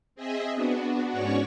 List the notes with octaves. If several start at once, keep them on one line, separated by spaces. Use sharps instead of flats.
C4 G#4 D#5 E5
B3 D4 F#4
G#2 C#4 F#4 C#5 D5 C#6